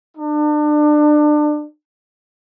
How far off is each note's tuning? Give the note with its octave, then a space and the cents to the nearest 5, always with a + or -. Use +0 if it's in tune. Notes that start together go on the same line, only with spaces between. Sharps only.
D4 +30